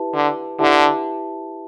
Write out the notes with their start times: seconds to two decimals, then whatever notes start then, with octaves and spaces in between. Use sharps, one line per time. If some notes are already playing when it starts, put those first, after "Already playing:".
Already playing: E4 G4 B4 E5 A5
0.14 D3
0.60 D3 E4 G4 B4 E5 A5